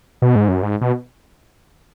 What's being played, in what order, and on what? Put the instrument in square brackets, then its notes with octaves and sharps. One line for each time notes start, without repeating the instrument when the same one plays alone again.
[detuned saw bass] B2
G#2
F#2
G#2
B2